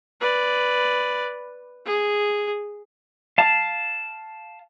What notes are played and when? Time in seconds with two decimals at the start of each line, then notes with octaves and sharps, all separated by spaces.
0.21 B4 D5
1.85 G#4
3.38 F5 A5